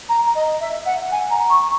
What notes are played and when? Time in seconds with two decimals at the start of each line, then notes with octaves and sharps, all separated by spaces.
0.09 A#5
0.35 D#5
0.60 E5
0.86 F#5
1.12 G#5
1.31 A#5
1.50 C#6